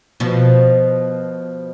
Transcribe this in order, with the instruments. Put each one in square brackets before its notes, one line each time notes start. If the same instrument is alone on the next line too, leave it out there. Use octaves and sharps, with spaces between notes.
[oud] B2 F3